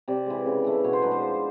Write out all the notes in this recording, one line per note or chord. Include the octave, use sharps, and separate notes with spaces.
C3 D5
E3 G#3
C#3
E3 A3
B2 C#5
C5
G#3 B3 D4 B4
C5
F3